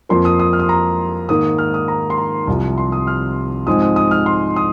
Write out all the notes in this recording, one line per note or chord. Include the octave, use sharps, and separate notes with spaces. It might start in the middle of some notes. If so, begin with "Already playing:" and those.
F2 F3 A#3 C6
D#6
D#6
F6
D#6
A#5
G#2 D#3 A#3 D#6
F6
D#6
A#5
C6
A#5
C2 C3 F3
C6
D#6
F6
G#2 F3 G#3 C4 D#6
D#6
D#6
F6
C6
D#6